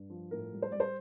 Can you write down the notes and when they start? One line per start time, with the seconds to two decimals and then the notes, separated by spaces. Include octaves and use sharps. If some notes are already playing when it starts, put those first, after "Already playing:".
Already playing: G2
0.10 F3
0.31 A2 A#4
0.53 G3
0.62 C5
0.72 G3 D5
0.80 C5